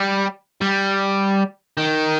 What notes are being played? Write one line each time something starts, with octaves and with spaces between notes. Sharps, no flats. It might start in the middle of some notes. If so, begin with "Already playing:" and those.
Already playing: G3
G3
D#3